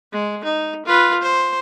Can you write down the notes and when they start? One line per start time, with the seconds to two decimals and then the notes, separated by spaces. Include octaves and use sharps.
0.12 G#3
0.44 D#4
0.86 F4 B4
1.21 C5